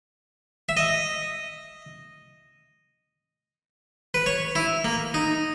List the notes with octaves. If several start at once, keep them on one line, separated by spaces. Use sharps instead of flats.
E5
D#5
B4
C#5
E4
A#3
D#4